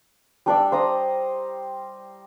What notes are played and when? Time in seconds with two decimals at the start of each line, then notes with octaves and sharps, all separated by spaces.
0.46 G3 D4 D5 E6
0.72 C5 A#5 D#6